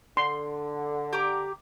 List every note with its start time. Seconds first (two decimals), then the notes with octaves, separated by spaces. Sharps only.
0.17 D3 C6
1.13 G4 A#5 D6